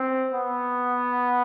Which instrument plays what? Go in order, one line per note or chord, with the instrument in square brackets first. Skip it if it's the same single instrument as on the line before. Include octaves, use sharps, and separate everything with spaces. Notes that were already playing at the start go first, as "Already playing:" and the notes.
Already playing: [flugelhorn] C4
B3